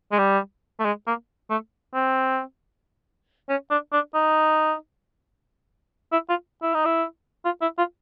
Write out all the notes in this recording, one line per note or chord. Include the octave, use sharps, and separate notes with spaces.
G#3
G3
A3
G#3
A#3
A3
C4
C#4
D4
D4
D#4
E4
F4
E4
D#4
E4
F4
E4
F4